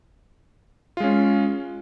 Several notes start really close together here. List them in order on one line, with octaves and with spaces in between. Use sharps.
F4 G#3 C#4